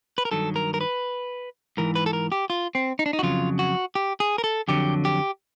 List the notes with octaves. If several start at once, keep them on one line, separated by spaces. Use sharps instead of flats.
B4
A#4
G2 D#3 F#3 A4
A#4
A#4
B4
G#2 E3 A#4
B4
A4
A#4
G4
F4
C4
D#4
D4
D#4
F#4
F2 C#3 F#3 F4
F#4
G4
G#4
A#4
A4
F2 D3 F#3 G4
G4